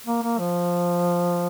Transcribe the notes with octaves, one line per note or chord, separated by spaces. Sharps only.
A#3
A#3
F3